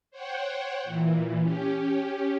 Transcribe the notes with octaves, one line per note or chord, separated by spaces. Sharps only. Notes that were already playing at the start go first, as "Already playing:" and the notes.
C5 C#5 F#5 G5
A#2 E3
C#4 G4